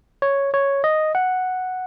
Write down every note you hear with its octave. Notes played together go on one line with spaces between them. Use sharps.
C#5
C#5
D#5
F#5